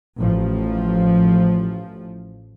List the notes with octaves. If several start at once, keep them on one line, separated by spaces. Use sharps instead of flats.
A1 F3